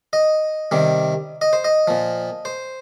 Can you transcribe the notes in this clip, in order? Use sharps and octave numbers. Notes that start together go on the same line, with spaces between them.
D#5
C3 D#3 G3
D#5
C5
D#5
A#2 F3
C5